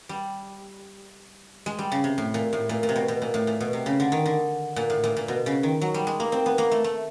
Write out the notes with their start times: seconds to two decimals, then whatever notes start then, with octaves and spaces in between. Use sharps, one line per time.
0.09 G3
1.66 G#3
1.79 G3
1.92 C#3
2.04 C3
2.18 A2
2.34 A#2
2.53 A2
2.69 A#2
2.83 A#2
2.89 C3
2.96 B2
3.08 B2
3.22 A#2
3.34 A2
3.47 A#2
3.60 B2
3.73 C3
3.86 C#3
4.00 D3
4.12 D#3
4.26 D3
4.76 A#2
4.90 A2
5.04 A#2
5.17 A#2
5.28 B2
5.46 C#3
5.63 D#3
5.81 F#3
5.94 G3
6.07 G#3
6.20 A#3
6.32 C4
6.46 B3
6.58 A#3
6.71 A3
6.84 A3